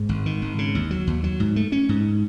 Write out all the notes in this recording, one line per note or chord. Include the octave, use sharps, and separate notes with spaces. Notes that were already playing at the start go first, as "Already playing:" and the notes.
Already playing: G#2
G#1
D#3
G#1
C#3
D#2
F#3
D#2
F#3
G#2
A3
C#4
G#2